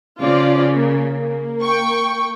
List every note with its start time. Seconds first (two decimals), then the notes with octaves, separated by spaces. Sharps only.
0.20 C#3 F3 F4 D5
0.75 A#3
1.08 A#3
1.62 G5 C#6